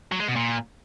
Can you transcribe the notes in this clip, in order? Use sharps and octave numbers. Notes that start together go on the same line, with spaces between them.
F#3
G#3
B2
A#2